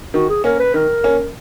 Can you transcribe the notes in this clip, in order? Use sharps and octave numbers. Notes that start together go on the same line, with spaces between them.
D#3 F#4
G#4
A#3 C#4 A#4
B4
D#3 A#4
A#3 C#4